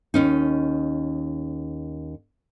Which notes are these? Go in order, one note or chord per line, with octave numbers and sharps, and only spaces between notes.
D#2 C#4 D#4